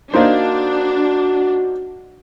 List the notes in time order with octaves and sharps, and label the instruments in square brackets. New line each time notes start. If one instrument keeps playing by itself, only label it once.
[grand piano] A#3 D#4 C5 [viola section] D4 [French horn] F#4